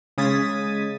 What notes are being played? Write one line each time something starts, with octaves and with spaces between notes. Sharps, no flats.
C#3 G#3 D#6 G#6 A6 B6